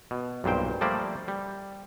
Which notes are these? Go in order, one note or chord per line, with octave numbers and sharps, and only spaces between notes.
B2
B1 G2 A#2 C5 G5
F3 G3 A3 A#3 C5 D5
G3